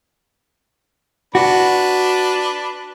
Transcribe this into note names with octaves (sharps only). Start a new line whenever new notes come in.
D4 F#4 B4